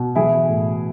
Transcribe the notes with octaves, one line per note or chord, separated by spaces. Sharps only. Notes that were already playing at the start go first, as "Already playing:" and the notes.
Already playing: B2
E3 E4 G#4
A2